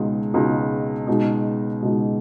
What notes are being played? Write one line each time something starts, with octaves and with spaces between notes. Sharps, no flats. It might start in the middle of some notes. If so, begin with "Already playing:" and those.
Already playing: C#2 B2 G#3 D#4
C#2 B2 G#3 D#4
C#2 B2 G#3 D#4
C#2 B2 G#3 D#4